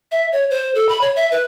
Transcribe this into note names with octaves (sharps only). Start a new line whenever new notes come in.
E5
C#5
C5
A4
B5
C#5
E5
B4